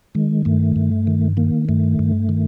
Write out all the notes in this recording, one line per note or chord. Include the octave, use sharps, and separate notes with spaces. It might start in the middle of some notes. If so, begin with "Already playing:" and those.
D#3 G#3
G2 A3
G2
D#3
D#3 A#3
G2 A3
G2
D#3